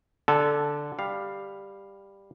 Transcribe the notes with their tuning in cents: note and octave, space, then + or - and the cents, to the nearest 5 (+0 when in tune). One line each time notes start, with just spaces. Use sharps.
D3 +0 A4 +0 A5 -45
G3 +10 F5 +0